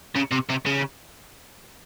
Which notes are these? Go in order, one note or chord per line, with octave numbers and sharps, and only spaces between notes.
C#3
C3
C3
C#3